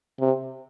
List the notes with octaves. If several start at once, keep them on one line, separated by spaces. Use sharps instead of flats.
C3